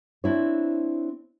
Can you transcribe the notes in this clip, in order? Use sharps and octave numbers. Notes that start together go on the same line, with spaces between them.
C4 D4 E4 C#5